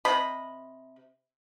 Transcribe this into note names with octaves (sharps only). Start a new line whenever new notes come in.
C3 D#5 B5